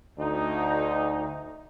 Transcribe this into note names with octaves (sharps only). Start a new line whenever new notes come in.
D2 D#4